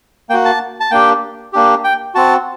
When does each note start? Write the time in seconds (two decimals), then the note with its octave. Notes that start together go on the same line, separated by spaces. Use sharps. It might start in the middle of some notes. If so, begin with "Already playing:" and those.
0.29 A#3 G5
0.33 F#4
0.45 A5
0.80 A5
0.91 A#3 D4 G4 G5
1.53 A#3 D4 G4
1.84 G5
2.15 C4 F#4 A5